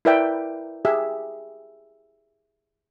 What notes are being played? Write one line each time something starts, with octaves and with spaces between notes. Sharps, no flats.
E4 A#4 B4 D5 E5 G5
G4 G#4 E5